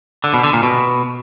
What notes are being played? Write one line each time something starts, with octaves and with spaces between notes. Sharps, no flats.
D3
B2
D3
A#2
B2